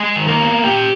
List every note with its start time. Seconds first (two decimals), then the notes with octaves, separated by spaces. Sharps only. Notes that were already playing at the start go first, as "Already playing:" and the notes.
Already playing: G#3 G#4
0.16 D#3
0.28 A#3 A#4
0.39 B3
0.64 A#2 G4 G5